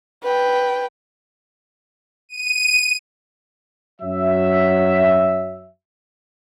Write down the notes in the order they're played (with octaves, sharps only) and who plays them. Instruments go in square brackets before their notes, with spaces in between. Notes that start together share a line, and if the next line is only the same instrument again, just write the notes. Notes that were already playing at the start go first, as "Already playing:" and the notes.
[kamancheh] B4 G5
[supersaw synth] D#7
[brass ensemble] F#2 F#3 E5